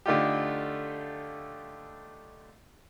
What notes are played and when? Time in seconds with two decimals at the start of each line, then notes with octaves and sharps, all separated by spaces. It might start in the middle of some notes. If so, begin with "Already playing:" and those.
0.06 D3 A3 D#4 F4 G4